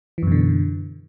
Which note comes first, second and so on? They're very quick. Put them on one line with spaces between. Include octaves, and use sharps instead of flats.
E3 F#2 B2 D3